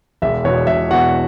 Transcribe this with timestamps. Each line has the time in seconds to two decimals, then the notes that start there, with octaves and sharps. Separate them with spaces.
0.22 E1 E5
0.44 E2 B2 C#5
0.67 E1 E5
0.90 E2 B2 F#4 F#5